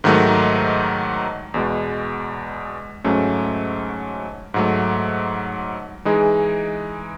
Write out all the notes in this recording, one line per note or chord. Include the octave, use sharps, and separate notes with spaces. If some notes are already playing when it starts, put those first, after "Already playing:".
G#2 D#3 F#3 A3 D#4
E2 B2 G#3
G#2 F#3 A3 C#4
G#2 F#3 A3
E3 G#3 D#4 G#4